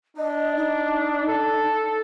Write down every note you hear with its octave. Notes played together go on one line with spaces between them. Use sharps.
D4 D#5
D#4
A4